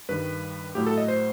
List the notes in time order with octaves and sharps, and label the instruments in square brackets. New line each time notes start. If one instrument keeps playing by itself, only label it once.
[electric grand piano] G2 D#3 G3 B4
A2 F#3 A3 G4
A4
D#5
C5